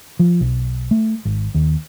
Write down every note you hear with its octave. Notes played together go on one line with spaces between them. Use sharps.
F3
B1
A3
G#1
D#2